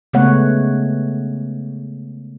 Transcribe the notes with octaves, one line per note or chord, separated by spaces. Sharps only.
C#3 G#3 A3 B3 C#5 F#5